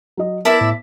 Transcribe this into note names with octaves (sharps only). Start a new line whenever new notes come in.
F#3 D#5
B3 E4 A#4 D5 E5 A5
A2